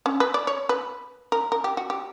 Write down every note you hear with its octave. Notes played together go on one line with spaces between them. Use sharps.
C#4
B4
D5
C#5
B4
A#4
A#4
G4
F#4
G4